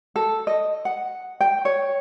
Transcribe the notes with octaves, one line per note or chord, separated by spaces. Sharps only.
A4
D#5
F#5
G5
C#5